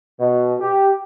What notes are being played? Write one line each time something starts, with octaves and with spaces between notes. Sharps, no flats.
B2
G4